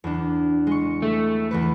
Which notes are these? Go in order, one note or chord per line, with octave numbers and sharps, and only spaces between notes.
E2 D4
G#3 C#6
A3
E2 E3 B4